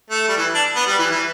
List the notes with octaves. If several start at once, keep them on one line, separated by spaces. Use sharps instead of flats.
A3
G3
E3
D4
B3
G3
E3
E3